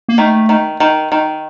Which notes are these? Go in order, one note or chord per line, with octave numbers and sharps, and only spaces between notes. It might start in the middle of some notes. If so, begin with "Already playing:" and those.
A#3
D#3 A3
D#3
D#3
D#3